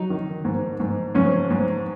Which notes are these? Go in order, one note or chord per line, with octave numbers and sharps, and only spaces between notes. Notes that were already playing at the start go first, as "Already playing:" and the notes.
Already playing: F#3 D#4
D#3
G#2
G#2
G#2 C#4
G#2